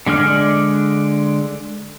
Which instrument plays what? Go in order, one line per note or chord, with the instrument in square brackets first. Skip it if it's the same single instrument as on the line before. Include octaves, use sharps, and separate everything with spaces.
[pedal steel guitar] D3 G#3 D4 F6